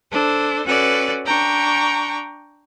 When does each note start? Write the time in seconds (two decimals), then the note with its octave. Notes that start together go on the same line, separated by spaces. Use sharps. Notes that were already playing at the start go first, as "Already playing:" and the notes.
0.11 D4 A4 C5
0.64 C#4 F#4 A4 B4 D5
1.24 D4 G5 A#5 C#6